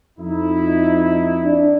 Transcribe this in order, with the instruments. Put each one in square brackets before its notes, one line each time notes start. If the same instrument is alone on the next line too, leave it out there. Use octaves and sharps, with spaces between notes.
[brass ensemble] F2 D#4 E4
[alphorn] D4